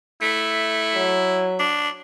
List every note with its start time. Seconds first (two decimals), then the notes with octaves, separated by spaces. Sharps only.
0.22 A3 E4
0.95 F#3
1.59 D4